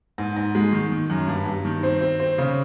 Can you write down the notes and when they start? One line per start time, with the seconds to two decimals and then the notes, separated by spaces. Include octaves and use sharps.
0.18 G#2
0.36 G#2
0.55 G#3
0.73 D#3
0.92 D#3
1.10 F#2
1.28 G2
1.46 G2
1.65 D#3
1.83 C4
2.01 C4
2.20 C4
2.38 C#3